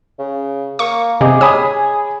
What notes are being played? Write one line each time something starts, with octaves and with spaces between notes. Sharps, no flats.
C#3
A#3 C#6
C3 G#4 D#5 D6
C#5 G#5 B5 D#6